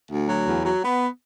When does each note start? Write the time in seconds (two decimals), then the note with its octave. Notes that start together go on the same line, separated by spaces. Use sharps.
0.11 D2
0.29 F#3
0.48 E2
0.65 F#3
0.84 B3